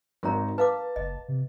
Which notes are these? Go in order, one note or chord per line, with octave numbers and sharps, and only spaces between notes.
G#1 D#4 F#4 A#4 C#5 A#5
B4 F5 A5 D6
F#1 D#5
C3